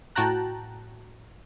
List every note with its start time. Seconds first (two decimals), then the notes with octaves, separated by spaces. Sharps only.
0.16 A2 F#4 G5 A5 A#5 F#6